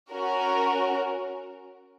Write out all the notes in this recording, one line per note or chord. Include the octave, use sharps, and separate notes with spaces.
C#4 F#4 A#4